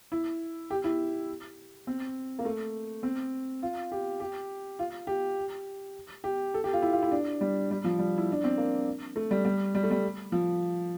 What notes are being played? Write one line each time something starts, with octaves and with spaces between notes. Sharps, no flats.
E4
G4
E4
C4
A#3
A3
C4
F4
G4
G4
F4
G4
G4
A4
G4
F4
E4
F4
E4
D4
G3
G3
F3
G3
E4
D4
C4
A#3
A3
G3
G3
G3
A3
G3
F3